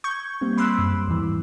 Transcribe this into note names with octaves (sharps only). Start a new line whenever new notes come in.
C#6 G6 G#6
G3 A#3 C4
B5 C6 D6 E6 F#6
F#2
E2 G#2 E3